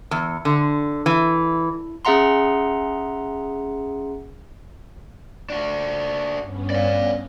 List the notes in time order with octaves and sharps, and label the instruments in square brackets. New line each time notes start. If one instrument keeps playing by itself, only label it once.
[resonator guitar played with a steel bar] E2
D3
E3
[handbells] C#4 G#4 E5 F#5 A#5 C6
[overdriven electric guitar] D4 F#4
[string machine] G2 B3 C#4
[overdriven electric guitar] D5 F5